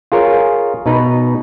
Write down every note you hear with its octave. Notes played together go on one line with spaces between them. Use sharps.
F4 G#4 A#4 C#5
B2 D#4 B4 A#5